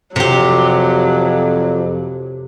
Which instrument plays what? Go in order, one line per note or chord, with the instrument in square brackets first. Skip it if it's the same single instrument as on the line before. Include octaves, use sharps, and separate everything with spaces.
[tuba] F2 [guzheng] C3 G4 [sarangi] F#3